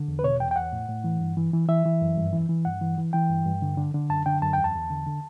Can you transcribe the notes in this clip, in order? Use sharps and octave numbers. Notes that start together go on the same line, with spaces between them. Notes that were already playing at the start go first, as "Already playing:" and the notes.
Already playing: D3
E2
B4
B2 C#5
E2 G5
G5
E2 F#5
A2
A2
E3
G2
E3
E3
E3 E5
E3
F#2
G2
E3
E3
G2 F#5
E3
E3
E3 G5
G2
G2
D3
D3
D3
F#2 A5
D3 G5
F#2 A5
E2 G5
A5
E2
D3
D3